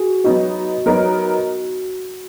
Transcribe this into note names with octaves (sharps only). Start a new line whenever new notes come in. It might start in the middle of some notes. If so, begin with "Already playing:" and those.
Already playing: F#4 G#4
F#3 B3 D#4 F#4
F#3 B3 D#4 A#4